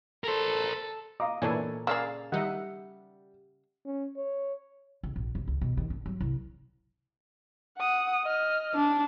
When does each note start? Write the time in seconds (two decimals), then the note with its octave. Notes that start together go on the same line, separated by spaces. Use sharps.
0.24 A4 A#4 C5
1.20 D#5 F5 A#5 D6
1.42 A#2 E3 B3 D4 A4 C#5 G#5
1.87 C#3 A#3 G#4 D5 F5 E6
2.32 D#3 G3 D#4 E5 F#5
3.86 C#4
4.17 C#5
5.03 C#2
5.16 A#1
5.35 F1
5.48 C#2
5.61 B2
5.77 D#3
5.90 D4
6.06 F#3
6.21 C2
7.78 F#5 D#6
8.24 D#5 F6
8.75 D4